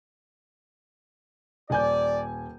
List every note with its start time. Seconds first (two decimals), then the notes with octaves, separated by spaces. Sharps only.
1.70 D#1 D5 G#5 G6